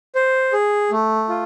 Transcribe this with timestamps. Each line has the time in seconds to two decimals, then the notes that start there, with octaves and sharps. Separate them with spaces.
0.15 C5
0.53 G#4
0.91 A3
1.29 F4